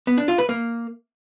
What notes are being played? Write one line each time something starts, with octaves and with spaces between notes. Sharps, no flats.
B3
D4
F4
B4
A#3